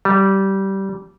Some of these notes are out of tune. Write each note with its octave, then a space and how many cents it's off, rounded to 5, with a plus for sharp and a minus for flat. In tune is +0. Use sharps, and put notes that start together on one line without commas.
G3 -15